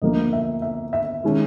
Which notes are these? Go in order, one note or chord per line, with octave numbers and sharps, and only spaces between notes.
D2 D3 F3 A#3 D#5
E5
E5
E5
D#3 G#3 C#4